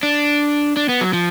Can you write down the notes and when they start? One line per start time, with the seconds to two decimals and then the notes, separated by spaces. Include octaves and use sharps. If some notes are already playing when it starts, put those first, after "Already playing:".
0.03 D4
0.77 D4
0.89 B3
1.01 F#3
1.13 F3